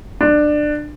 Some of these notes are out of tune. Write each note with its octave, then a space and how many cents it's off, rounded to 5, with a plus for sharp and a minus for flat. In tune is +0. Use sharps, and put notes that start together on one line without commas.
D4 +20